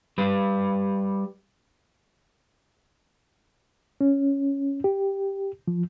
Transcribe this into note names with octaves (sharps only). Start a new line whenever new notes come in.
G3 B4
C#4
G4
F3